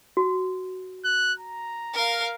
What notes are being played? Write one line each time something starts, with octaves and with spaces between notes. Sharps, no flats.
F#4
F#6
A#5
A#4 F5